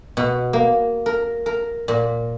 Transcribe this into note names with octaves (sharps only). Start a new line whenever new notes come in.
B2
A#3
A#4
A#4
A#2